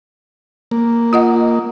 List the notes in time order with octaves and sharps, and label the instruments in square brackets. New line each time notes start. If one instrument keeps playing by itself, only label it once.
[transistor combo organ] A#3
[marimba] F4 D#5 F#5